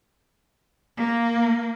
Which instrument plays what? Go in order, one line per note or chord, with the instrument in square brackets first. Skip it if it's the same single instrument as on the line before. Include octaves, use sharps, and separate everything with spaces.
[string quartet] A#3